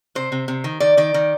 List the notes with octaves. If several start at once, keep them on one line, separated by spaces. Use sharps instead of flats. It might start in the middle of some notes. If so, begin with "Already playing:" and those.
C3 C5
C3
C3
D#3
D#3 D5
D#3 D5
D#3